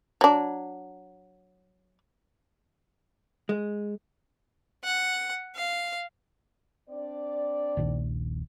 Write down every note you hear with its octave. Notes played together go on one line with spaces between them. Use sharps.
F#3 D4
G#3
F#5
F5
C4 D4 D5
D#1 A#1 D#2